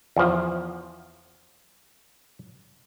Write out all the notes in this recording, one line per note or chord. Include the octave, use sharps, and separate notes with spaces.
E2 F3